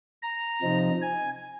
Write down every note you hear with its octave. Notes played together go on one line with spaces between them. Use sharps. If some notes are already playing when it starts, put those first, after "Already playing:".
A#5
C3 F3 C4 D#4
G#5